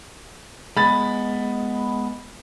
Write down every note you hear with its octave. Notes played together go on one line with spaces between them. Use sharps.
G#3 B3 B5 A6